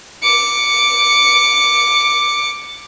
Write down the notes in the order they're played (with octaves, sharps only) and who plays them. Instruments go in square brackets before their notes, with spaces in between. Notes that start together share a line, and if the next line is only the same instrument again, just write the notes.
[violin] D6 C#7